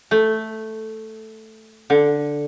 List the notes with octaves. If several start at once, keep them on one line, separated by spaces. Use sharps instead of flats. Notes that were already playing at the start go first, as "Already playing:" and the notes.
A3
D3